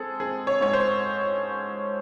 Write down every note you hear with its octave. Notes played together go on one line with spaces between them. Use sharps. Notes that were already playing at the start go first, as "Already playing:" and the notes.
Already playing: G#3 C4 G#4 A4
C4 G#4
C#5
G#2 C#5
C5